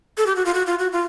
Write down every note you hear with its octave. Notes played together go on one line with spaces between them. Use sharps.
A4
G4
F#4
F4
F#4
F4
F#4
F4